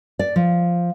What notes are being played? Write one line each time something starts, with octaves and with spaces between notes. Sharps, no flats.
D5
F3